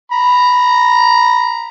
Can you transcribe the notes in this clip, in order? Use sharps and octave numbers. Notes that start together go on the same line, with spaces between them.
A#5 B5